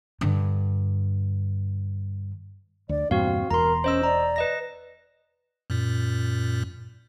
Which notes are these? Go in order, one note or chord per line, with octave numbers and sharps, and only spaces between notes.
G2 D3
D2 D5
E2 G2 A#2 C4 F#4 F5
E1 E2 A#4 A#5 C6
C#4 C5 D#5 E6
D5 A#5
B4 D#5 A#6
F#2 A#2